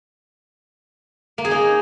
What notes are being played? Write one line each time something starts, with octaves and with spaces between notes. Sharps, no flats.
A#3
G#4
D#4